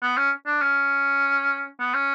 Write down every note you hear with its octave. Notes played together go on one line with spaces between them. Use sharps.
B3
C#4
D4
C#4
B3
C#4